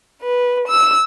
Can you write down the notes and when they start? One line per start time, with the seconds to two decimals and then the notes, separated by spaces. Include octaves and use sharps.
0.23 B4
0.68 E6